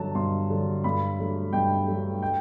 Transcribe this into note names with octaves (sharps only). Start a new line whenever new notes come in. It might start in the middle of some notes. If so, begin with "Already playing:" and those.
Already playing: G2 D3 F#3 A5
G2 C6
D3 F#3
G2 B5
F#3 A3
G2 G5
F#3 A3
G5